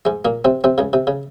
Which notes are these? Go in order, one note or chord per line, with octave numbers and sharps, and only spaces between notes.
G#2 G#3
A#2 A#3
C3 C4
C3 C4
C#2 C#3
C3
C#3